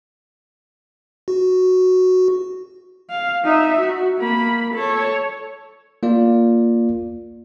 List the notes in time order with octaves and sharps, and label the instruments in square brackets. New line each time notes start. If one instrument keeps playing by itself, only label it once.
[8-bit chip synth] F#4
[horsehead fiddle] F5
D#4 E5
F#4
A#3 B5
A4 C#5
[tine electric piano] A#3 F4 D5